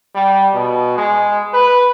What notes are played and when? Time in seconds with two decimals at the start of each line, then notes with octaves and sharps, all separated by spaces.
0.15 G3
0.54 B2
0.98 G#3
1.54 B4